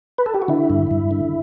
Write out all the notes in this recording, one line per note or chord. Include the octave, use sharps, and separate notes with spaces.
B4
A4
G4
F#4
D3 E4
G2
G2
D3